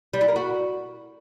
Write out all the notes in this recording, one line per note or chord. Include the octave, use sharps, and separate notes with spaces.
G3
E4
A#4
F#4